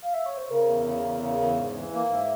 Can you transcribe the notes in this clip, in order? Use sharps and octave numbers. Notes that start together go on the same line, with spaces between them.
F5
E5
C#5
C5
C#3 A#4
E2
C#3
E2
C#3
E2
G#2
E3
A#3
G#2 E5